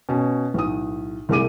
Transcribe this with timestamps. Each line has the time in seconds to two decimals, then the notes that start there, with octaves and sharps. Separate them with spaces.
0.09 B2 C#4
0.54 B1 A2 D#6
1.29 C2 A#2 A3 G#4 D6 D#7